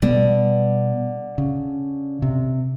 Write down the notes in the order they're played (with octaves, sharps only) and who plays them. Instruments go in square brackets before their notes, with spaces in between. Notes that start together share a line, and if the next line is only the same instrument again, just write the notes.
[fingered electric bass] B2 G3 B3 [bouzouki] D3
[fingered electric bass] C#3
C3